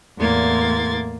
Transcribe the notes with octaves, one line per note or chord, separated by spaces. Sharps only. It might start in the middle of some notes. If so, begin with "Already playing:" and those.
E2 A2 A#3 C6 G#6 A6